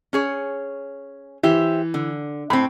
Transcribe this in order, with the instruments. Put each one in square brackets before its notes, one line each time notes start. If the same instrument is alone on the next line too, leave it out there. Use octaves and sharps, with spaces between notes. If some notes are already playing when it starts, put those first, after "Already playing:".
[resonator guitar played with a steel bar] C#4 G#4 C#5
[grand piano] E3 [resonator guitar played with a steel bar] G4 C5 E5
[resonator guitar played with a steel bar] D3
[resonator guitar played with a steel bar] A2 C4 [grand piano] B5